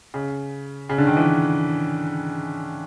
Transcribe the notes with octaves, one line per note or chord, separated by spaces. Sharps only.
C#3
C#3
D3
D#3
E3